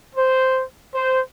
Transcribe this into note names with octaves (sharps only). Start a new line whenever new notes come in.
C5
C5